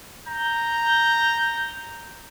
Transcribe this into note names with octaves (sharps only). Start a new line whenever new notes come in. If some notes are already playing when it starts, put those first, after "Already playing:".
A#5 G6